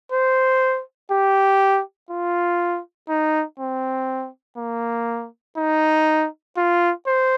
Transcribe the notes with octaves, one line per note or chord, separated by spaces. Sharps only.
C5
G4
F4
D#4
C4
A#3
D#4
F4
C5